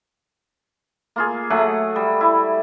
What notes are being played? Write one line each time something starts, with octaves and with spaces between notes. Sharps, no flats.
A#3 F4 G#4
F#3 A3 G#4 F#5
G3
E4